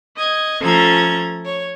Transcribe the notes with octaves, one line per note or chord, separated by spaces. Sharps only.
D#5 G#6
F3 A3 C#4 A4 A#5 G#6
C#5